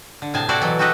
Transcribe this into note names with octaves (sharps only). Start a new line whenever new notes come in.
D3
A2 C3 G#4 G#5 A5
C4 E4 F#4 A4 C5 D5
B2 E3 F#3
F#4 G4 A4 B4 D#5 E5